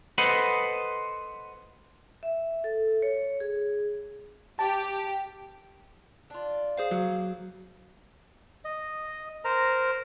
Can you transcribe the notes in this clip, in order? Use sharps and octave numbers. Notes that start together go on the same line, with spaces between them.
A4 B4 C5 D#5 F#5 B5
E5
A4
C#5
G#4
G4 A5
D4 F4
G#4 C5 F5
F#3 A#3
D#5
A#4 C5 A#5